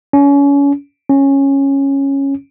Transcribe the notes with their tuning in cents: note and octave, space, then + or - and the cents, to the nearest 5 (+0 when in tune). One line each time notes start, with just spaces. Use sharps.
C#4 +30
C#4 -10